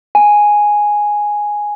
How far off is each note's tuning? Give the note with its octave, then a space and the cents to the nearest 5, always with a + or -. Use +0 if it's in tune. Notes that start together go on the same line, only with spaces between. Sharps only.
G#5 +0